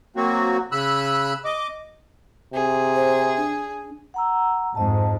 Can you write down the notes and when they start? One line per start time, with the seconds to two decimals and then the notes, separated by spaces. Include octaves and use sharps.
0.16 F#3 A#3 C4 F#4
0.72 C#3 B5 E6 F#6
1.45 D#5 D6
2.54 C3 G#4
2.94 C5
3.37 D4
4.14 F#5 A#5 E6
4.75 F2 G#2 C5 D#5 A5